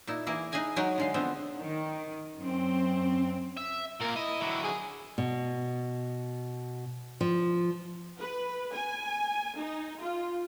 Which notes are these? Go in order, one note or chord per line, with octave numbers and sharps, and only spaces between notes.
A#2 D#4 E4
E3 A#3 E4 G#4 A#4
D#4 G#4 B4 D#5 G#5 A#5
F#3 G#3 D#4 A#4 B4 C#5
D3 G#3 F5
D3 F3 B3 C4
D#3
F#2 C4
E5
A#2 A#3 A#4
E4 D#5
D3 F#3
G#4
B2
F3
B4
G#5
D#4
F4